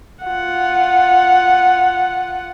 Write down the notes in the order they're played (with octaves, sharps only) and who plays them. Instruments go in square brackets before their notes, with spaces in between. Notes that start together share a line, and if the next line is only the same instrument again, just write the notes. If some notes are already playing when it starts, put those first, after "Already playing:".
[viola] F4 F#5